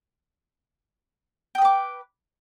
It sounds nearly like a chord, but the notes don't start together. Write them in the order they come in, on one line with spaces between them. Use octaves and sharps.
G5 D#6 B4 D6